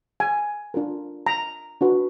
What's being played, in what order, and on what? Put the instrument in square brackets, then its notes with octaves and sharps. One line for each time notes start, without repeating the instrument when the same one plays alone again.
[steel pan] G#5
D4 F4 A#4
A#5
D4 F#4 B4